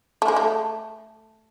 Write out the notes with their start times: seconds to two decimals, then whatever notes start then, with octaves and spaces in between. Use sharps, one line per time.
0.22 A3
0.28 G#3
0.36 A3